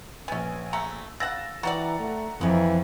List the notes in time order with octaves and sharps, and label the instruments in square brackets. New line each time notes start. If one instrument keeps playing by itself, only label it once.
[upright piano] A#1 G#5 [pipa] B3 C#4
[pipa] A3 F#5 A#5
[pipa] C#3 F#5 [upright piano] E6 A6 A#6
[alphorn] E3 [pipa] F#4 G4 D5 [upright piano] F#5 A#5 A6
[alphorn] A3
[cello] F2 [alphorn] E3 [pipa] G#3 B3